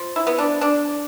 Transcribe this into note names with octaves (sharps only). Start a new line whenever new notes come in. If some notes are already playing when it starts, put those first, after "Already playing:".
Already playing: F3
E4
B3
D4
D4